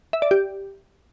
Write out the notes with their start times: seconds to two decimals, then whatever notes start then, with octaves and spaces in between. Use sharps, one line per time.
0.13 E5
0.22 D5
0.31 G4